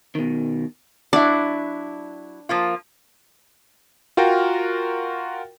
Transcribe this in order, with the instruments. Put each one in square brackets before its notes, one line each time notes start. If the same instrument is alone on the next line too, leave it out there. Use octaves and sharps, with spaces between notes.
[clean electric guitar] B2 D#3
[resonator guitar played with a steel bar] F#3 E4 [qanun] D4
[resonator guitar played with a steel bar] F3 A#3 F4
[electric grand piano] F4 F#4 A#4 G5